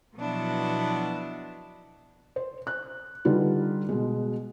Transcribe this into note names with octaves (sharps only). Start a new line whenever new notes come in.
B2 F3 F#3 B3 D4 E4
C5
F#6
D3 G3 D#4 F4 B4
B2 G#3